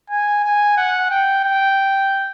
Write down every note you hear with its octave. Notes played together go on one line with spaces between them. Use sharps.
G#5
G#5
F#5
G5
G5